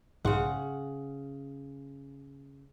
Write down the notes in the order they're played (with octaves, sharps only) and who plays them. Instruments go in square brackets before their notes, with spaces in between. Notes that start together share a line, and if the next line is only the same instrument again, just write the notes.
[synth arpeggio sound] B1 G#2 C6 [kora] C#3 F#5